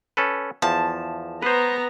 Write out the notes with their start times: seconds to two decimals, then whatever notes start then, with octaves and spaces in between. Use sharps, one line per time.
0.17 C#4 A4 B4
0.62 E2 F3 A5
1.42 B3 B4 C5 A#5